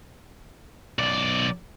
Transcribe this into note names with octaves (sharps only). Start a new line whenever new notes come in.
B1 D5